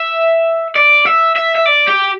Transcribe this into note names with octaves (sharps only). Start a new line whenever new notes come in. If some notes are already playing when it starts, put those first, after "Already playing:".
Already playing: E5
D5
E5
E5
E5
D5
G4